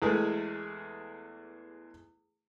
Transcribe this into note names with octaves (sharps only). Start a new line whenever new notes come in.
E2 E3 G#3 A3 G#4 A#4